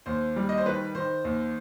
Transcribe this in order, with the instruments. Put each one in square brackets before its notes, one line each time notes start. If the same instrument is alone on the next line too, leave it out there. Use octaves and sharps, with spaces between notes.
[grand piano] D#2 C5
G3
D#5
C5
D#3 B4
D#3 C5
D#2